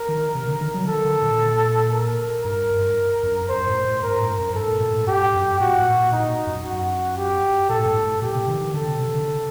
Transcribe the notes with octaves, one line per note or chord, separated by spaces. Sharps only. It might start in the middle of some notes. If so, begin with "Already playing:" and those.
Already playing: A#4
D#3
C3
D3
D#3
F#3
D#3 A4
D3
A#2
A#4
G2 A#4
G2
F#2
F#2 C5
A2
A2
G2 A#4
A2
F#2
G2 A4
A2
A#2
A2
G2 G4
F#2
A2 F#4
A2
A#2
A#2 D#4
F#2
F#2 F#4
G4
A#2 A4
A2
G2
A2
A#2 G4
C3
D#3
D#3
D3 A4
C3
C3
D3